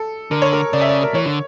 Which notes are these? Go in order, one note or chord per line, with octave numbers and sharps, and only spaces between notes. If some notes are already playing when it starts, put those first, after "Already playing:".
Already playing: A4
D3 A#4
C#5
A#4
C#3 D5
E5
D5
A#4
E3 C#5
D3